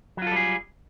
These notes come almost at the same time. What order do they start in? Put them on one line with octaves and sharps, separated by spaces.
F#3 F4 A4 G3 G#4